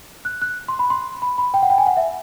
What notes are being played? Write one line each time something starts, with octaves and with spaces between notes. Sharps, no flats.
F#6
F#6
C6
B5
C6
B5
B5
G5
F#5
G5
G#5
F#5
E5